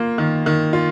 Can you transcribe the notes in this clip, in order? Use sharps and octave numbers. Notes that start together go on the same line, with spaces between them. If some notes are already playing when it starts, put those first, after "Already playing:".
Already playing: A#3 F4
D#3
D#3
F4